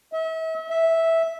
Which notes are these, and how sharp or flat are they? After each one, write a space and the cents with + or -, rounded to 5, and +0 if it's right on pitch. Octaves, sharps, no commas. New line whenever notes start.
E5 -40
E5 -10